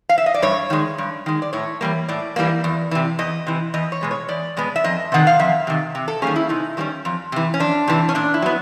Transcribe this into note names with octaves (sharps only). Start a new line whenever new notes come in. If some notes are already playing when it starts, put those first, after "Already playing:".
F5
E5
D#5
D5
G2 C#5
D#3 G#3
G2
D#3 G#3
D5
A2 C#5
E3 G3 A#3
A2 D5
E3 G3 A#3
E2
C3 E3
E2 D#5
C3 E3
E2 D#5
C#5
B2 G#3 B3
C#5
E2 D5
B2 G#3 B3
E5
F2 D#5
C3 D#3 F#5
F5
F2 E5
C3 D#3
C3
A4
D#3 G3 A#3 C#4 G#4
E4
C3 D#4
D#3 G3 A#3 C#4
F2
C3 E3
C#4
F2 D4
C3 E3
C#4
A#2 D4
E4
F#3 B3